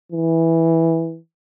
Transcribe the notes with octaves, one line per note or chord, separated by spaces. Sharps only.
E3